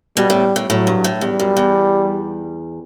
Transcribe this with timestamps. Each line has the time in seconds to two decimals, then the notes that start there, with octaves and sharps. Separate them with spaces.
0.17 B2 G3
0.30 A2
0.56 A2
0.70 A2 F#3
0.87 G2
1.04 A2
1.21 E2 G3
1.40 F#2
1.57 E2